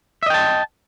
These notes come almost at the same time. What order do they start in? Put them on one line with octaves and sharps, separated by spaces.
E5 D#5 G5 A5